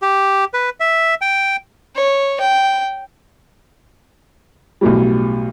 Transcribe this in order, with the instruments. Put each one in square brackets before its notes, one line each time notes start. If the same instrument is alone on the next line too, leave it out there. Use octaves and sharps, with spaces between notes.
[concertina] G4
B4
E5
G5
[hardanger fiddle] C#5
G5
[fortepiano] B1 A2 F#3 G3